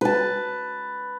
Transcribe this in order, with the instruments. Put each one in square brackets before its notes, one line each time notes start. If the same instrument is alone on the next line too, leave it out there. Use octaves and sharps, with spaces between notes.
[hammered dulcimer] B4 A5